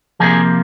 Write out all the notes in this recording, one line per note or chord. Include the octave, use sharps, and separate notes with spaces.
C3 F3 A#3 G#4